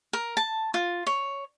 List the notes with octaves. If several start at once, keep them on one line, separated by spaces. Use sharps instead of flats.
A#4
A5
F4
C#5